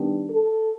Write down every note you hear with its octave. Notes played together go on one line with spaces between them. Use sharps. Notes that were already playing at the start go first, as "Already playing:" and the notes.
Already playing: D#3 G3 B3 D4
A4